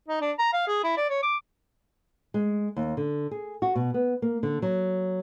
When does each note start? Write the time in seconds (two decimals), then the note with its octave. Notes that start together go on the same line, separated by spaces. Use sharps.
0.08 D#4
0.21 D4
0.39 A#5
0.53 F5
0.68 G#4
0.84 E4
0.97 D5
1.09 C#5
1.23 D6
2.34 G#3
2.76 D#2
2.97 D3
3.31 G#4
3.62 F#4
3.75 B2
3.94 B3
4.22 A#3
4.43 D3
4.62 F#3